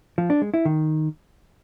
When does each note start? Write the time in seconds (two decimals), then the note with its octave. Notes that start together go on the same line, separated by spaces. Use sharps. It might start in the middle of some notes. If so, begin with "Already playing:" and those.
0.18 F3
0.30 D4
0.42 G#3
0.54 E4
0.65 D#3